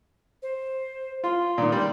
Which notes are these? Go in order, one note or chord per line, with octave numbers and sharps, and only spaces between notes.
C5
F4 C6
A#2 D#3
G3